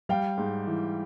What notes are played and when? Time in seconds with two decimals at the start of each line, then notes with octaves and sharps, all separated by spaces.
0.09 G3 F5 G5
0.38 G#2
0.67 E3